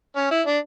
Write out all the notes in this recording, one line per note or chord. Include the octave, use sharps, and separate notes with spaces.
C#4
E4
D4